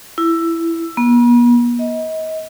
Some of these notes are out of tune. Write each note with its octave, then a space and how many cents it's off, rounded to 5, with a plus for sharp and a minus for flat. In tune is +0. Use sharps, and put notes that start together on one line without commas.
E4 +10
B3 -45
D#5 +30